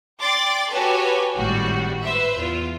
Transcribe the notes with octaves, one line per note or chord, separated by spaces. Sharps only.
D5 G5 C6 D6 A6
F#4 G4 A4 B4 C#5 G#5
G#1 A2 G3 F#4
B4 C5 E5
E2 F4